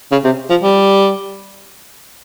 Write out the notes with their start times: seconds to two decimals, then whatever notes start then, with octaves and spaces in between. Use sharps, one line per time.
0.12 C#3
0.25 C3
0.50 F3
0.63 G3